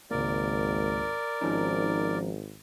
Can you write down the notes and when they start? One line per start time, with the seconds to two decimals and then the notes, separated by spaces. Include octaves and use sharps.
0.11 G#1 C#2 A#3 A#4 D5
1.41 G#1 F3 C#4 D#4